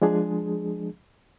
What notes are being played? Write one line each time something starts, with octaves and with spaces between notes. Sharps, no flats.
F3 G#3 D4 G#4